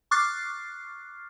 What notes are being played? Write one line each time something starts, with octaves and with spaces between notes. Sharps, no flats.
C#6 D6 F6 F#6 A6 C7